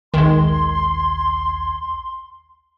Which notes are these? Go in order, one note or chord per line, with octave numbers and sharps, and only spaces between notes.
A#1 D#2 D#3 G#3 C6 G#6